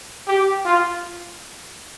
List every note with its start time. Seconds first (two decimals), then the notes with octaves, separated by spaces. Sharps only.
0.28 G4
0.65 F4